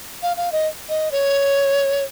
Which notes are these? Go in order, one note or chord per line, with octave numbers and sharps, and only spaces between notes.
F5
F5
D#5
D#5
C#5